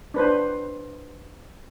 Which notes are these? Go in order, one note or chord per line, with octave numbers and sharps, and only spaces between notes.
D4 B4 C5